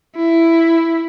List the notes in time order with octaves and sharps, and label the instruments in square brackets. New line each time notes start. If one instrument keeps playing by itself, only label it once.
[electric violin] E4